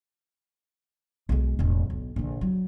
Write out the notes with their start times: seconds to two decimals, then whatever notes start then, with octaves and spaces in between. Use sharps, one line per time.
1.29 B1 G#3
1.59 E1 A1
1.90 B1
2.16 A#1 D3
2.41 F#3